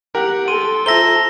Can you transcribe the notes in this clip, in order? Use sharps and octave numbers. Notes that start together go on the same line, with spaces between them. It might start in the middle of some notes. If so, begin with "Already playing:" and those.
G4 A#4 F#5
A4 C6 D#7
F4 C5 E5 A5 A#5 E6 A#6 G7